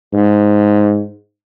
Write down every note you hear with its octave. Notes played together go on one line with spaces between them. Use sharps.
G#2